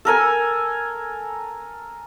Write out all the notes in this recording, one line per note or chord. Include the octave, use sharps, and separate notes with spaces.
A4 A#4 G#5